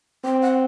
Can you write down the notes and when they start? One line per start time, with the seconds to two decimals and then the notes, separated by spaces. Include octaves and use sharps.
0.24 C4 G5
0.42 F#5